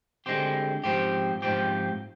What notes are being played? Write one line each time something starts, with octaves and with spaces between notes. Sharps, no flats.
D3 G#3 C4 G4
G#2 F3 C4 G4
G#2 F3 C4 G4